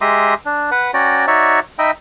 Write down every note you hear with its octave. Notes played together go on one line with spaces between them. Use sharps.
G#3 G4 E5 A#5 C6 D#6
D4
B4 F#5
C#4 F#4 D5 G5 A#5
D#4 F#4 C#5 D5 E5
D#4 D#5 E5 G5 B5